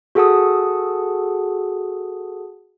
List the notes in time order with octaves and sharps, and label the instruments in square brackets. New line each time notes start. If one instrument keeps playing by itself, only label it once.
[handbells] F#4 G#4 A4 F#5 A5 D#6